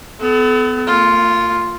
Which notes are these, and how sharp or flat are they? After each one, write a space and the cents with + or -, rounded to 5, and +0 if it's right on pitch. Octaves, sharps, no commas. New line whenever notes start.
B3 +30 A4 -30
A#3 -45 F4 +0